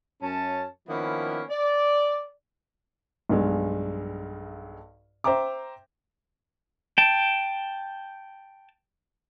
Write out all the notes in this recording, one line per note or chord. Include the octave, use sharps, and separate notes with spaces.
F#2 C#4 A5
D#3 F3 A#3 B3 C#4 E4
D5
B1 G2 G#3
C5 E5 G5 A#5 D6
G5 A5